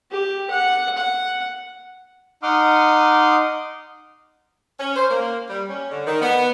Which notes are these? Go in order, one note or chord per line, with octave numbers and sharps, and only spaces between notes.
G4
F#5
F#5
D#4 F#5 C6 D6 D#6 F6
C#4
C5
A#3
G3
C#4
D3
D#3
B3